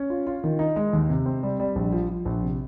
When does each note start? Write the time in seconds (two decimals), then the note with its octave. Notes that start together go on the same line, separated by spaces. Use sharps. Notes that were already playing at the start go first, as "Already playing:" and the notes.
Already playing: C#4
0.10 F4
0.27 F4
0.44 D#3
0.59 D#4
0.76 G#3
0.93 D#2
1.09 C3
1.26 C4
1.43 G3
1.60 G3
1.76 A#1
1.93 F3
2.09 F3
2.25 A#1
2.43 C3